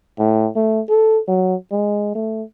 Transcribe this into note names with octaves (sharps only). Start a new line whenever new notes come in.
A2
A3
A4
F#3
G#3
A3